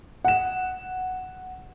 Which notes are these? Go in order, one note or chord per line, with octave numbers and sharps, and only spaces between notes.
F#5 E7